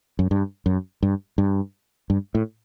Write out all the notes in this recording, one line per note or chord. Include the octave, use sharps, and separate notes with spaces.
F#2
G2
F#2
G2
G2
G2
A2